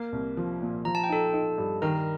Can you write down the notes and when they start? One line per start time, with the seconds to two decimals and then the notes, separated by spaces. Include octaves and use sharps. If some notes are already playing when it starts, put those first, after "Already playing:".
Already playing: A#3 A#4
0.12 C2
0.37 F3
0.62 A#2
0.85 F3 A#5
0.95 A5
1.04 G5
1.09 D#4 A4 A5
1.33 D#4
1.58 G2
1.82 D#3 A#4 A#5